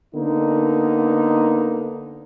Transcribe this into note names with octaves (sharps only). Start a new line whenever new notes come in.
D3 A#3 B3 D#4